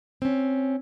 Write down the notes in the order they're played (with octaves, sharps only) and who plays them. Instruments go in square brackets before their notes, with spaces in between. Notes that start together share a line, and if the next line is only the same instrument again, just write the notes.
[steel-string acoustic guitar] C4 C#4